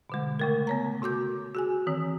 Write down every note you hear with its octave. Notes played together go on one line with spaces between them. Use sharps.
B2 D3 G#3
C#3 A3 A#4
B3 C#5 A#5
C3 F#4 D6 G6
F#4 G#4 G#5
D#3 E3 C4